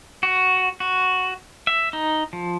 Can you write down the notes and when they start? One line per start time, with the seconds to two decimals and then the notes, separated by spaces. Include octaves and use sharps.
0.23 F#4
0.80 F#4
1.67 E5
1.93 D#4
2.33 F3